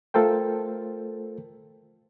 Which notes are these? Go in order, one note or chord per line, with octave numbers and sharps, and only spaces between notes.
A3 F4 A4 A#4 C5 G5